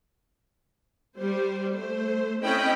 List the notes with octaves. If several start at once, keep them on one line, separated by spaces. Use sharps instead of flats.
G3 C5
A3 C5
C4 C#4 E4 D#5 G5 B5